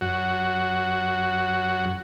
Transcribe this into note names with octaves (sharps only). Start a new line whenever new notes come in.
F#2 F#4